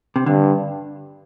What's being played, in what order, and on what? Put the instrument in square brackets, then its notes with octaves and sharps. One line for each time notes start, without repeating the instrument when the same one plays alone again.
[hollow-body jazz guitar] C3
[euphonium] G2 [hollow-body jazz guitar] D3